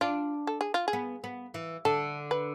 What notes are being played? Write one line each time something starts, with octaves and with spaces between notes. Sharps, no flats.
D4 F4
A4
G#4
F4
G#4
B3
B3
E3
D3 A4
B4